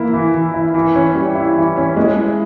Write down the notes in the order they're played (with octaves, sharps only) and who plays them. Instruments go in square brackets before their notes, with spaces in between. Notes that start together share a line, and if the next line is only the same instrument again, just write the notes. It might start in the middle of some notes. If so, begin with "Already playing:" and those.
Already playing: [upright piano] E3 A#3 E4
E3
E3
E4
E3
C#4
G3
E4
E3
C#4
G#3
E4